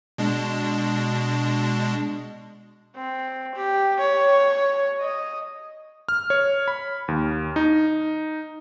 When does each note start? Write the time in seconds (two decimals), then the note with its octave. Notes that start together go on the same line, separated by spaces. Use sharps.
0.18 B2 G#3 D4
2.96 C4
3.55 G4
3.99 C#5
5.00 D#5
6.09 F6
6.30 C#5
6.68 B5
7.08 D#2
7.56 D#4